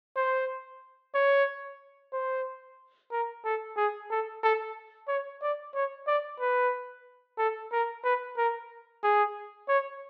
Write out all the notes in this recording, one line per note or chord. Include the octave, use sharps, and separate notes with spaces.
C5
C#5
C5
A#4
A4
G#4
A4
A4
C#5
D5
C#5
D5
B4
A4
A#4
B4
A#4
G#4
C#5